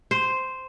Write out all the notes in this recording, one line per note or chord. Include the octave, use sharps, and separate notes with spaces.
C5